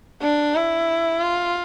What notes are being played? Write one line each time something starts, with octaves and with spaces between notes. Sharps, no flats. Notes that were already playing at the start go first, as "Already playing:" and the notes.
D4
E4
F4